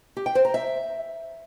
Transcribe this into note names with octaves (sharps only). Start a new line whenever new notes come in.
G4
G5
C5
A#5
E5